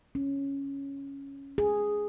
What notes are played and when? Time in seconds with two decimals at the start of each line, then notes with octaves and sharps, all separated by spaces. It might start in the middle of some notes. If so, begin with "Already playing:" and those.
0.15 C#4
1.58 G#4